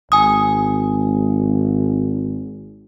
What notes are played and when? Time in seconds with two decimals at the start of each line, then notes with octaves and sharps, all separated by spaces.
0.12 G#1 G#5 D#6